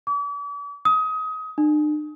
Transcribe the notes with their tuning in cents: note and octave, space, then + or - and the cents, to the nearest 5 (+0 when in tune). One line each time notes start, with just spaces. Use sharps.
D6 -45
D#6 +25
D4 +45